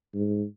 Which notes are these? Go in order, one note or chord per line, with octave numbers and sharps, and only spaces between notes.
G#2